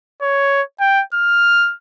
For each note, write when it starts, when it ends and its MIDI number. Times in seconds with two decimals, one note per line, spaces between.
0.22 0.62 73
0.80 1.03 79
1.14 1.74 89